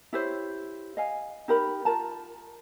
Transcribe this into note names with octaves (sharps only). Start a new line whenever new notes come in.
E4 G4 C5 C#5
D#5 F5 G#5
D#4 G4 A#4 B5
F4 A#4 A5 A#5